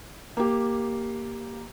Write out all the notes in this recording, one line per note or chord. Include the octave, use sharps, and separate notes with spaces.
A#3 G4